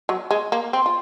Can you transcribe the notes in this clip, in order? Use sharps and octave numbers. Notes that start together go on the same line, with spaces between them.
F#3
G#3
A#3
C4
F4